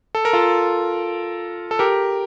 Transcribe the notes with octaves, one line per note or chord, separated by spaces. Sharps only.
A4
A#4
F4 A4
A4
G4 A#4